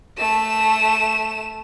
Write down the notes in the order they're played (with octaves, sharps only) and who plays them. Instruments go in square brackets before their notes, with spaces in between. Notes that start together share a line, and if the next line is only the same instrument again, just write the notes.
[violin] A3 E7